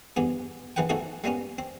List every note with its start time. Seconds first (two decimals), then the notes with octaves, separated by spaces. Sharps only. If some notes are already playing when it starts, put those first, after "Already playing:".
0.16 E2 G2 B3 G#4
0.76 A#1 E3 G#4 B4 F#5 G5
0.89 A3 C4 D#4 F#4 G#4 A4
1.24 G3 G#3 A#3 B3 C#4
1.58 C4